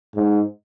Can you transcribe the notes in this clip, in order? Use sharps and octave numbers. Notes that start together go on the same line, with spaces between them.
G#2